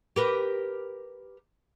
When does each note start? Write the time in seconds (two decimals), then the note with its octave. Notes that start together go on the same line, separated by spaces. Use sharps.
0.16 G4 A#4 B4